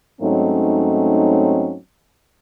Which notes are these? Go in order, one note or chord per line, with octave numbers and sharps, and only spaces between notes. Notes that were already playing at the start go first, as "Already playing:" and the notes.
G#2 F#3 A3 C4 C#4 D#4